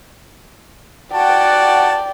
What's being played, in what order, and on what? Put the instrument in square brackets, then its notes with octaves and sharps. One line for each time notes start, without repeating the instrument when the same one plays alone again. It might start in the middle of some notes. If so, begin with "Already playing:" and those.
[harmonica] F#4 F#5 A5 [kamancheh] D5 G5